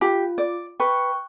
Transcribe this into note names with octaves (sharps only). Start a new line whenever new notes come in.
F4 G4
D5
B4 G5 C#6 F#6